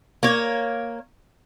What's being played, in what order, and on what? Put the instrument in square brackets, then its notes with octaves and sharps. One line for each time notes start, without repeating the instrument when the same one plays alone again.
[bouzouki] A#3 C#5